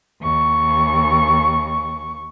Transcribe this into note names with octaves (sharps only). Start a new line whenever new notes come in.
D#2 C#6